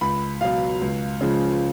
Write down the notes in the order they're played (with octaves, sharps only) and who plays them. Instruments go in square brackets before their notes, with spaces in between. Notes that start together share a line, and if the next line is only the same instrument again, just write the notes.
[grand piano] C#2 B5
B2 F#3 F5
C#2
C#3 F3 G#3